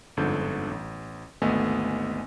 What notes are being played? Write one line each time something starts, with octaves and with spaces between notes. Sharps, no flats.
G1 F2 G#2 D3 A4 G6
A1
G#1 D2 A3 B3 D#5 G#5